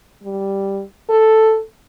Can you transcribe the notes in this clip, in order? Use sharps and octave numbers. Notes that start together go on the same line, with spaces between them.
G3
A4